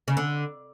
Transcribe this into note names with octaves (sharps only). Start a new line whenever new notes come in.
C#3
D3